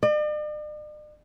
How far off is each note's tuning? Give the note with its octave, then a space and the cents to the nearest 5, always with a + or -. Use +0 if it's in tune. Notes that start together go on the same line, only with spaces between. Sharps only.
D5 +45